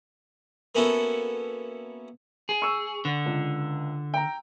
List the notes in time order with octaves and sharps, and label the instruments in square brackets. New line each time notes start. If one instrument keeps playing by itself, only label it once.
[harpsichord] A#3 B3 C#4 E4 F#4 A4
[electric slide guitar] G#4
[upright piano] C#6 E6
[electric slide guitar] D3
[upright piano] C#2
G5 A#5